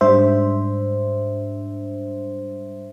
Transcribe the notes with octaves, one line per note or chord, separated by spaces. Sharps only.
G#2 G3 D4 C5 E5